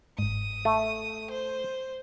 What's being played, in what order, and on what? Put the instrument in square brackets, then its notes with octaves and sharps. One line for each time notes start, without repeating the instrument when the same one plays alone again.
[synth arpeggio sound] G1 G#2 [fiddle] D#6
[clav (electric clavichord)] A3
[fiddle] C5